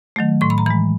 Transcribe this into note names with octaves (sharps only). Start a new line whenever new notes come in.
D#3 F#3 A3
A2 C6
B5
A#5
E3 G#3 B5